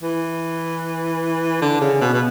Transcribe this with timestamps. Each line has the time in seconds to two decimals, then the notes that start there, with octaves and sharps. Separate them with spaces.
0.03 E3
1.62 D3
1.81 C#3
2.01 B2
2.14 B2